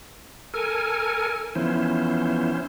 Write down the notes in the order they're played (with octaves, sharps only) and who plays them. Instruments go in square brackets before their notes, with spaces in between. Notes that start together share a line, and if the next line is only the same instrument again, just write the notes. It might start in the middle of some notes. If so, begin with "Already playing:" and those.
[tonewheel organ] A4 A#4 G#5
[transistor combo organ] E3 F3 B3 [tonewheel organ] C#4 E4 C5